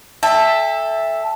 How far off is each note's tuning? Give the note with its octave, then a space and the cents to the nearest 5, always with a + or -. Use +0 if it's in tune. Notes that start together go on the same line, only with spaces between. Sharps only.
A4 +0 E5 +0 G5 +40